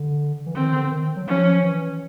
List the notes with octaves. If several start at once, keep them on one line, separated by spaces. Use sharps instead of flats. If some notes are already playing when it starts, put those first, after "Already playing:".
Already playing: D3
E3
D#3 C4
D3
D#3
F#3
F3 C#4
E3